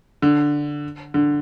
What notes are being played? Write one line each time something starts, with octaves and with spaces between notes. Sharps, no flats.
D3
D3